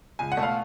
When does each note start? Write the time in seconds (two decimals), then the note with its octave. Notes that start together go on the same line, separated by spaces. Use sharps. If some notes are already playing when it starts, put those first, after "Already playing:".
0.19 C#2 G#5
0.32 F#5
0.37 B2 A3
0.43 F5